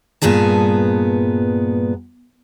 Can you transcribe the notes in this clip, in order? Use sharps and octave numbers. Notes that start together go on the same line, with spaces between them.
G2 A#2 B3 G#4 A5